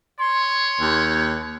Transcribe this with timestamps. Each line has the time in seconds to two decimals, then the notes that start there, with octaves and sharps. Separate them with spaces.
0.19 C#5 C6
0.80 D#2